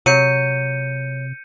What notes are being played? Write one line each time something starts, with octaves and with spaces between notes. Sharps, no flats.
C3 F#3 G6 C#7 D#7